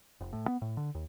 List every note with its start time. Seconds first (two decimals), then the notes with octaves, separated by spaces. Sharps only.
0.21 F1
0.33 A2
0.48 B3
0.62 A2
0.77 D3
0.95 D#2